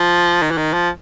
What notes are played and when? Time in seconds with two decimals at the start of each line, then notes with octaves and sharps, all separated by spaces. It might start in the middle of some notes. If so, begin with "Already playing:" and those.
Already playing: F3
0.42 D#3
0.51 E3
0.58 D#3
0.73 F3